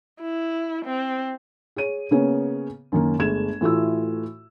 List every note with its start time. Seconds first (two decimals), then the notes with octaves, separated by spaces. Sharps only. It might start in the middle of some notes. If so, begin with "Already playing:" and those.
0.22 E4
0.85 C4
1.76 G#4 C#5 D#7
2.11 C#3 A#3 B3 C#4
2.92 F#2 D#3 A#3
3.19 G1 G#3 A3 G#6 E7
3.61 A2 E3 A3 F4 F#4 E6